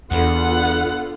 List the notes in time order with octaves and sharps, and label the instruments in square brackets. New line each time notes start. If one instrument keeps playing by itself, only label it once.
[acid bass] E2 [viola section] D3 F4 [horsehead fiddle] B3 [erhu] F#5